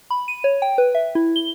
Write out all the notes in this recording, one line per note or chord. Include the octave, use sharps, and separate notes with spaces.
B5
D#7
C#5
G5
B4
E5
E4
G7